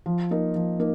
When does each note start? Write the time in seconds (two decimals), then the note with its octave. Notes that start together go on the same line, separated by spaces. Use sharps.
0.06 F3
0.31 A#3 D#4 A#4
0.55 F3
0.80 A#3 D#4